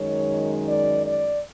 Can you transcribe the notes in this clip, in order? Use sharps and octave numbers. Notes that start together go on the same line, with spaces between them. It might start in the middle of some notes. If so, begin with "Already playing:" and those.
Already playing: F#2 D#3 G#3 C#5
D5
D5